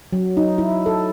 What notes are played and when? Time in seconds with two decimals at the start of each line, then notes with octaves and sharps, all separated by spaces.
0.13 F#3
0.37 D#4
0.58 E4
0.86 A4